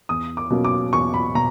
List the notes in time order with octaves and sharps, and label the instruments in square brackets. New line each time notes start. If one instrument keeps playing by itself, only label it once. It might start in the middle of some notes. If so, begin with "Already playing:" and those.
[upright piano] E2 D#6
D6
B2 F#3 A#3 C#4
D6
E2 C#6
B5
B2 A#5